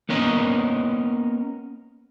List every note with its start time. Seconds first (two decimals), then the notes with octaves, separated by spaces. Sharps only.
0.09 A#3 B3 C#4 A#4 C#5 D#5